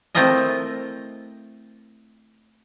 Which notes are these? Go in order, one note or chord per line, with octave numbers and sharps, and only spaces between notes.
A3 C4 E4 F4 A#4 D#5